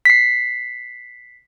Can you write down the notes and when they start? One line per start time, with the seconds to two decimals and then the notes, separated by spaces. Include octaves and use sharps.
0.05 B6 C7